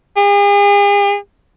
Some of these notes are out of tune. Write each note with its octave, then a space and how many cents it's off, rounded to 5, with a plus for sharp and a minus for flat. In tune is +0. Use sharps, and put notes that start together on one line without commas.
G#4 -45